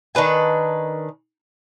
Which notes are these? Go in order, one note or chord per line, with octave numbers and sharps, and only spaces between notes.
D#3 D4 B4 G#5